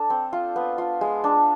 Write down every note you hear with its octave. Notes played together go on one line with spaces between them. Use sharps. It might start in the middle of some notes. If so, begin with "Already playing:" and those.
Already playing: D4 A4
C4
F4
B3
F4
G#3
D4